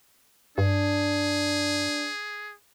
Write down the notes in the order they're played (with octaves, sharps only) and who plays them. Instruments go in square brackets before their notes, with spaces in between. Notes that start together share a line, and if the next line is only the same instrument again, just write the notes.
[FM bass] G2 [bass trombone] D4 [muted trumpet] G#4